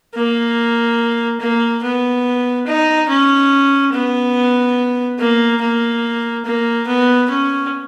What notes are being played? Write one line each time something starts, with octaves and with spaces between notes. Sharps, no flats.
A#3
A#3
B3
D#4
C#4
B3
A#3
A#3
A#3
B3
C#4